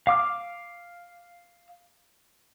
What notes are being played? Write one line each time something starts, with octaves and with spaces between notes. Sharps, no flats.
F5 D6 F6